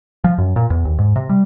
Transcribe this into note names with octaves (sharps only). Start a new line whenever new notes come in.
F3
F#2
A#2
E2
D#2
G#2
C3
G3